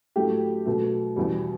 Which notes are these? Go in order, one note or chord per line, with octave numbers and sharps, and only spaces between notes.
A2 F#3 A3 G4
B2 F#3 A3
E2 B2 G3